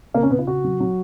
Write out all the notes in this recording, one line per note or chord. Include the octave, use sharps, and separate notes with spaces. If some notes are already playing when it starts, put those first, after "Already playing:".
C#3 A#3
C#4
C#3 B3
F4
C#3 F#4
F#3
F#3